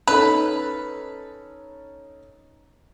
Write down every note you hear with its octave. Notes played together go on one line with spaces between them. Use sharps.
C#4 D#4 A4 B4